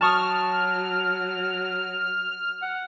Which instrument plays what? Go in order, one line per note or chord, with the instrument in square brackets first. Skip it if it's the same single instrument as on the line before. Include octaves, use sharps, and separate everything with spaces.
[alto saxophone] F#3 [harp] A5 C#6 D#6 [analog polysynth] F6
[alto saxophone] F#5